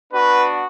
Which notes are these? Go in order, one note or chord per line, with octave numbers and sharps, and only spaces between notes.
B3 D4 F#4 B4